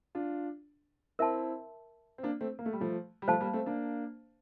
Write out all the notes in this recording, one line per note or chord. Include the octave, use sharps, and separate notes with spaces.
D4 F4
C4 E4 A#4 E5 A5 C6
C4
A#3 D4
A3 C4
A#3
A3
G3
F3 A3
G3
F3 A3 C5 F5 A5
G3 A#3
A3 C4
A#3 D4